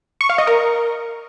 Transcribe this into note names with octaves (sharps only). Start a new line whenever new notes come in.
C#6
F5
D#5
A#4